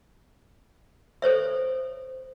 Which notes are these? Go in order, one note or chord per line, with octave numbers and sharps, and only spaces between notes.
A4 C5 C#5 E5